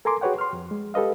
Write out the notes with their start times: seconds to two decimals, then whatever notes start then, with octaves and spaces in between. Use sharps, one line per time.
0.05 A4 A#4 G#5 A#5 C6 D6
0.21 F#4 G#4 B4 C#5 F#5 G5
0.39 C6 F6
0.53 F2
0.71 G#3
0.94 G4 A4 B4 D#5 F5